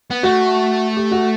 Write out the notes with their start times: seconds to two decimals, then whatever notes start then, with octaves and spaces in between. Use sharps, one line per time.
0.11 B3
0.23 A3 F#4
0.97 G4
1.11 F#4